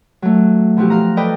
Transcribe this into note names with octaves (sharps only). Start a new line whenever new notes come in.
F#3 A3
B2 F3 E4 F#4 G4
F5 A#5
A4 B4 D5 D#5 G5